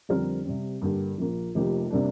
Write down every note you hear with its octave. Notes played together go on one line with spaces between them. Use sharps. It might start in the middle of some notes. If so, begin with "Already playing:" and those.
F2 D3 G3 C4 A#4
C3 G3 C4
G2 D3 A#3 G4
A#1 A#2 F3 A#3 F4
F1 F2 F3 A#3 G4
C3 G3 A#3 D4